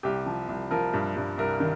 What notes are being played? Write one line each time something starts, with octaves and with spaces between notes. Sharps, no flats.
C2 G4
F3
C2
F3 A#4
G2
G2
C2 A#4
D#3